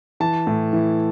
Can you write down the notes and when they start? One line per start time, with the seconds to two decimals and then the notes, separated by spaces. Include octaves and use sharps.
0.20 E3 A5
0.47 A2
0.73 E3